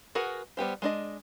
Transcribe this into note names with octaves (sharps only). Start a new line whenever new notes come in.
F#4 G#4 A#4 B4 F#5
G3 B3 G4 C5
G#3 D4 D#5